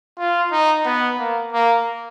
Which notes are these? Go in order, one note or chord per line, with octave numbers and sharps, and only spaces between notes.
F4
D#4
B3
A#3
A#3